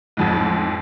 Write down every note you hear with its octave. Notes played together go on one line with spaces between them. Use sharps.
A1 F2 G#2